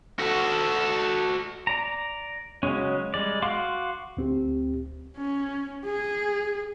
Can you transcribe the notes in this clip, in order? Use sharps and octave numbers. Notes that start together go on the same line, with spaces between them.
F#4 A4
D5 A#5
C#3 F#3 G#3 C#4
G3 G#3 D5
F#4 F5 C6 D6
D2 C4 G4
C#4
G#4